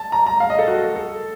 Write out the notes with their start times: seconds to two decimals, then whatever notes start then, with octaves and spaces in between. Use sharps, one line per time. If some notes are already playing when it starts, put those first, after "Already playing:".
Already playing: A5
0.12 A#5
0.26 A#5
0.40 F5
0.50 D#5
0.59 A4
0.68 F#4
0.82 A4
0.96 A4